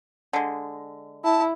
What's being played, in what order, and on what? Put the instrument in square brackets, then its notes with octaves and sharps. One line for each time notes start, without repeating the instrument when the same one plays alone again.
[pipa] D3 G#3
[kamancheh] E4 [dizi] A5